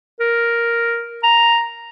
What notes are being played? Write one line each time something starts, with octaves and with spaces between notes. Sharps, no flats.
A#4
A#5